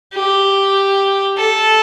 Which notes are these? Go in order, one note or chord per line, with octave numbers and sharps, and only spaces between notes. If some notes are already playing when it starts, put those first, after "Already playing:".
G4
A4